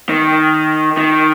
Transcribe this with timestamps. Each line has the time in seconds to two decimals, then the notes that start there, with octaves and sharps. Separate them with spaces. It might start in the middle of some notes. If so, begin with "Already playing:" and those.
0.09 D#3
0.97 D#3